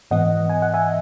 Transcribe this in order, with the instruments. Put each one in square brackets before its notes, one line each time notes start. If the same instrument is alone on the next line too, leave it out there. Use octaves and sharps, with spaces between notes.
[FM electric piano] G#2 E3 B3 D#5 F#5
G#5
F#5
E5 G#5